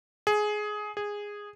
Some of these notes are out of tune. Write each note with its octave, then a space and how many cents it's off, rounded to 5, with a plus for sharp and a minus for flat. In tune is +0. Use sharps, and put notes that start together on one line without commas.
G#4 +15
G#4 -10